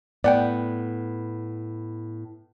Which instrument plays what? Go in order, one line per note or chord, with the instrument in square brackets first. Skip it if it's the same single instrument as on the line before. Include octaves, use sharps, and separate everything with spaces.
[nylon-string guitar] A2 B3 [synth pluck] D5 F#5 G5